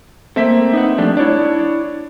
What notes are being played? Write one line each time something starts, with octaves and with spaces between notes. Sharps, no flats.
A3 A#3 C4 E5 B6
D#4 B4 F#5
F3 G3 A3 D4
D4 E4 C#5 D5